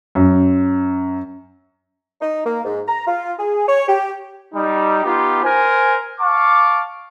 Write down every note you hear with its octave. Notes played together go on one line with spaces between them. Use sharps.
F#2
D#4
A#3
G#2
A#5
F4
G#4
C#5
G4
G3 D#4
B3 D#4 F4 G4
A#4 C5 G#5
F5 A5 C#6 D6